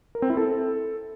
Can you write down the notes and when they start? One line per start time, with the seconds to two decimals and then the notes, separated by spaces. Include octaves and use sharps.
0.15 A#4
0.22 C4
0.30 E4
0.37 A4